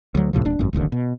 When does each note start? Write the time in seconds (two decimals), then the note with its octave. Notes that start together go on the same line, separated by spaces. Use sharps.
0.15 D2 F#3
0.33 C#2 A2 C3 F3
0.45 D#1 D4
0.59 G#1 F#2
0.73 D1 A1 D#2 D3
0.92 B2